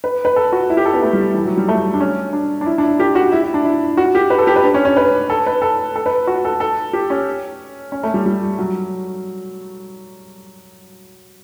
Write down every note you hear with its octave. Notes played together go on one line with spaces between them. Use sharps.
B4
B4
A4
F#4
E4
G4
A4
B3
A3
G3
E3
F#3
G3
A3
D4
C#4
D4
D4
E4
D4
E4
G4
F#4
E4
E4
D4
E4
F#4
G4
B4
A4
G4
B4
D4
C#4
C#4
B4
A4
B4
A4
A4
B4
F#4
A4
A4
G4
C#4
C#4
A3
G3
G3
F#3